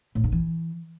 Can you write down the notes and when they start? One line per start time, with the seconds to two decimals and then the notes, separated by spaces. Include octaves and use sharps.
0.15 A2
0.24 G2
0.32 E3